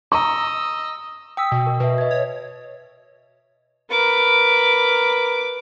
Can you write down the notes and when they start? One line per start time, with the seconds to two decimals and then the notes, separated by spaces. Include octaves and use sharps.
0.12 D#5 A#5 C#6 E6
1.37 G5 D#6 E6 B6
1.52 B2
1.67 A#4
1.80 B2 B4 E5
1.98 D#5 G#6
2.11 C#5
3.91 A#4 B4 D6